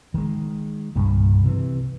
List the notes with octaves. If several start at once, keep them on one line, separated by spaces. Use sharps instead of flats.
D#3 G#3
C2 G2 A#2
C3 D#3 E3